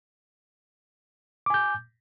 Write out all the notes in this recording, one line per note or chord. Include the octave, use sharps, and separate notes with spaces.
G#5 D6 G6